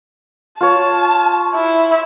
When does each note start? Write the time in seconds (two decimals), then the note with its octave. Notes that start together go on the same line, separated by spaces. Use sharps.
0.61 F4 C#5 A5
1.55 E4